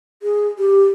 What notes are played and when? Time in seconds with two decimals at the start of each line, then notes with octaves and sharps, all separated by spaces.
0.23 G#4
0.59 G4